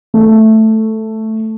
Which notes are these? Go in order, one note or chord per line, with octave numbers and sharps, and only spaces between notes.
A3